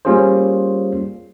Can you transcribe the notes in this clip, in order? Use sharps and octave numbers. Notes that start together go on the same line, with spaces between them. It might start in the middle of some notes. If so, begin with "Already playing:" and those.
G3 A#3 C#4 F4 G#4 C5